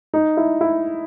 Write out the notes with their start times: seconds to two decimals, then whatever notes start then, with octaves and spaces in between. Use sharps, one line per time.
0.14 D#4
0.37 E4
0.61 E4